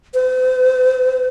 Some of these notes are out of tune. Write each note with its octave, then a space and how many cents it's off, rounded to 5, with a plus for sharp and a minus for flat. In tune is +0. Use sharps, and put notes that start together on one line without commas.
C5 -40